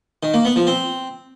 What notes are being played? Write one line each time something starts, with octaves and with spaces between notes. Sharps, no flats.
D#3
A#3
B3
F3
C4